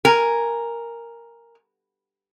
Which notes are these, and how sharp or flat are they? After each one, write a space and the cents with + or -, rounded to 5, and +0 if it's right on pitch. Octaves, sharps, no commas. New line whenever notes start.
A#4 +0 G#5 +0